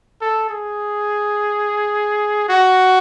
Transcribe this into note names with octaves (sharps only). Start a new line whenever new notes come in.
A4
G#4
F#4